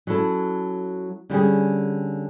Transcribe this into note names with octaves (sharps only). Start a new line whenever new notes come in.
F#3 C#4 E4 A4
D3 G3 C#4 G#4